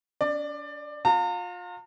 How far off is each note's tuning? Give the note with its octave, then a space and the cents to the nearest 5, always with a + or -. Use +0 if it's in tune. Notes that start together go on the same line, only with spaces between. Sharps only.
D4 -40 D5 +20
F4 +30 A#5 -40